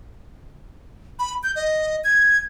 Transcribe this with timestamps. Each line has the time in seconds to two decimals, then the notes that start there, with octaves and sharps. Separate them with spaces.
1.19 B5
1.43 G6
1.56 D#5
2.04 G#6